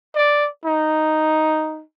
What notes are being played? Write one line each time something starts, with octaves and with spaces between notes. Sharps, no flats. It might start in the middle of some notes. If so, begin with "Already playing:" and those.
D5
D#4